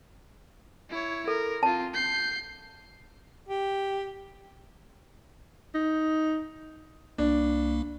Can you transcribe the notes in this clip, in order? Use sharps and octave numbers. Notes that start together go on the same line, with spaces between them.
E4 C#5
A4 A#4
C4 F4 A5
G6 C7
G4
D#4
C2 A#3 D4